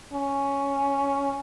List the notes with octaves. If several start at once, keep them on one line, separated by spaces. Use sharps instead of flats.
C#4